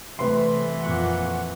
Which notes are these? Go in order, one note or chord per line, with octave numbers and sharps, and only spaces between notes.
C3 E3 G3 A3 B4 C6
F2 A#2 F#5 C#6